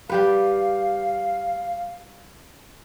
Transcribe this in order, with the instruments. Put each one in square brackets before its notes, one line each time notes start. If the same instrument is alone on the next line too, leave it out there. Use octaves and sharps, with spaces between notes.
[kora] G3 G4 B4 [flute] F5